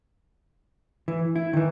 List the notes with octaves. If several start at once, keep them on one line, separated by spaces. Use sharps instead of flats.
E3
E4
D#3 E3